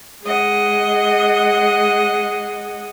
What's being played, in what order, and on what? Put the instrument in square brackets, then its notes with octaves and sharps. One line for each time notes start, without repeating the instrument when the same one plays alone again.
[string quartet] G#3 G#4 D#5 F#5